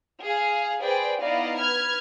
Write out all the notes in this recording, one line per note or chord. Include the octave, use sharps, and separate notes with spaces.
G#4 F5
G#4 B4 C5 D5 G5
B3 D#4 E4 D5 D#5 F5
B4 F6 G#6